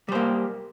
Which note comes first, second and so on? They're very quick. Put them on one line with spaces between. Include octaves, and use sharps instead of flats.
G3 C5 A#3